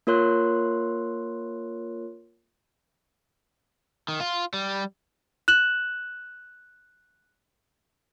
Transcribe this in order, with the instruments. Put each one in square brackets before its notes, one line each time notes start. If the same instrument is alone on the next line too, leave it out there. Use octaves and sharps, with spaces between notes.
[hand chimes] A#3 F4 A#4 C#5 C6 F#6
[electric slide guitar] D#3
F4
G3
[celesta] F#6 E7 F#7